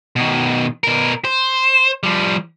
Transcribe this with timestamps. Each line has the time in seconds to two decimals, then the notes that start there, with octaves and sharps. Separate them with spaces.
0.16 B2 D#3
0.84 B2 A#4
1.25 C5
2.03 F3 G3